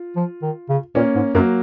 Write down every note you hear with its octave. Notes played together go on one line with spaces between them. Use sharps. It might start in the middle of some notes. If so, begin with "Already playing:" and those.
Already playing: F4
F3
D#3
C#3
A#2 A#3 C#4
G#2
F#2 F#3 A#3